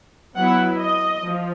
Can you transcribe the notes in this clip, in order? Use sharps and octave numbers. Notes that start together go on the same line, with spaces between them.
F#3 B3 E4 F#5
D#5
F3